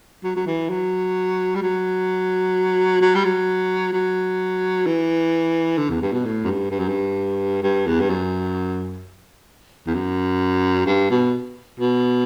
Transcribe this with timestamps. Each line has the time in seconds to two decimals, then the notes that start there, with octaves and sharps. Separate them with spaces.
0.24 F#3
0.36 F#3
0.46 E3
0.70 F#3
1.55 G3
1.62 F#3
3.01 F#3
3.15 G3
3.25 F#3
3.93 F#3
4.86 E3
5.78 D3
5.90 E2
6.02 G2
6.13 B2
6.25 A2
6.44 F#2
6.47 G2
6.71 G2
6.79 F#2
6.88 G2
7.63 G2
7.87 E2
8.00 G2
8.10 F#2
9.87 E2
9.95 F#2
10.86 G2
11.10 B2
11.80 B2